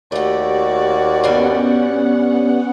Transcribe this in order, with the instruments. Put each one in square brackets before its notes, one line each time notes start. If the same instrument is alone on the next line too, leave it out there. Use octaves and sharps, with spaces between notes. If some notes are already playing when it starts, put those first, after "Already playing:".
[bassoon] D#2 [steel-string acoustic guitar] A3 G4 [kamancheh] F#4 D5
[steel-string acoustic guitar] G2 G3 G#5 [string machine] B3 C#4 F#5